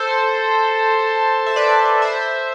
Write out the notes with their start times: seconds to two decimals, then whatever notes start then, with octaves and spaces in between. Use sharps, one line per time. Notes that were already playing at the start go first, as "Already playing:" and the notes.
Already playing: A4 C5
1.46 E5
1.56 B4 D5
2.02 C5 E5